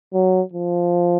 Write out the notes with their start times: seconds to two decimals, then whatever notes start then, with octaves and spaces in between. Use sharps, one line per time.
0.14 F#3
0.53 F3